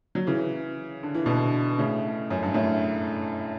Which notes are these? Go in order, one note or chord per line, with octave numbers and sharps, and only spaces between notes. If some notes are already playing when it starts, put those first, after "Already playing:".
F#3
C#3 E3
D3
E3
B2 D3
A2 C#3
F#2
G2
F#2 A2